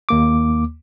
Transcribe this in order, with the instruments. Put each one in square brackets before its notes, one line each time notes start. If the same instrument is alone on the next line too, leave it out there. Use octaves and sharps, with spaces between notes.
[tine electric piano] D#2 A#3 D6